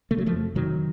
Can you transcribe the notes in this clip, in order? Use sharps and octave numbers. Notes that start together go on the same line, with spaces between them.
C3 A3
F#3
F3 A3
F2
C3 D#3 F#3